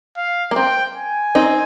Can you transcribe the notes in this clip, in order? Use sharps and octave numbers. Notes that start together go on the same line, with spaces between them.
F5
A#3
C4 G5
G#5
C4 D#4